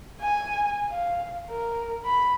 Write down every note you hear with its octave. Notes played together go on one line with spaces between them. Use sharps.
G#5
F5
A#4
B5